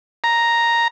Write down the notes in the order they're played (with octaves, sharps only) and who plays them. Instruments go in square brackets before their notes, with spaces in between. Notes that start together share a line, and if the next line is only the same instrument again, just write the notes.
[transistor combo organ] A#5